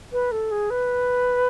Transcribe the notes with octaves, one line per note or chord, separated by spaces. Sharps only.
B4
A4
G#4
B4